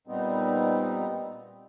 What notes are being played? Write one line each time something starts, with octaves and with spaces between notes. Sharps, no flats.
A#2 G3 B3 C4 D#4